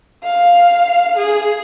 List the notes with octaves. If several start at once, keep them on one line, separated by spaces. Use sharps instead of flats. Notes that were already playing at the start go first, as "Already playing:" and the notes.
F5
G#4